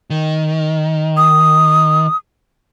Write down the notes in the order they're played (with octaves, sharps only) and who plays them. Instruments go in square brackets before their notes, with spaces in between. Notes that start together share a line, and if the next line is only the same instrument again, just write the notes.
[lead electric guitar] D#3
[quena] D#6